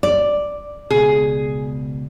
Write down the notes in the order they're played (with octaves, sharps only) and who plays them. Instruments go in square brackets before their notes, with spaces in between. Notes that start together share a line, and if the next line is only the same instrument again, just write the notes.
[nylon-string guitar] D5
[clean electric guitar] C#2 B2 [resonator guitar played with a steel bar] G#4